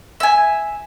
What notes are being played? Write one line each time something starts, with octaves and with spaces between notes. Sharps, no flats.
E5 G#5